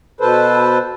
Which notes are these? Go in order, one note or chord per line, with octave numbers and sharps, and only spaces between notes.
B2 A4 B4 C5